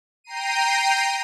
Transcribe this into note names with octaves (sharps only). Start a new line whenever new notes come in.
G5 A#5 C7 D#7